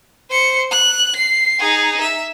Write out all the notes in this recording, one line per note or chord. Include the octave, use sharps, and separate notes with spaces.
C5 C#7
F#6
C7
D#4 G#4
E5